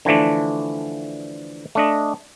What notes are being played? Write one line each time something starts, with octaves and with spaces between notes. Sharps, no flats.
D3 E3 F3 A3 D4
A3 D4 D#5